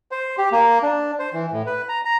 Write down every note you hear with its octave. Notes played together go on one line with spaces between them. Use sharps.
C5
G4
A#3
D4
C5
E3
A2
B4
A#5
A#5